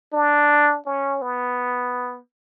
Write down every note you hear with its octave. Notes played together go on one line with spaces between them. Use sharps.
D4
C#4
B3